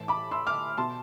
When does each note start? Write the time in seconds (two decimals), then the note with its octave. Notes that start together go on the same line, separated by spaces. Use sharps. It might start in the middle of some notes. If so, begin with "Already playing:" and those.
Already playing: A2 E3 A5
0.08 B5 D6
0.31 C6 E6
0.47 D6 F6
0.77 B2 A5 C6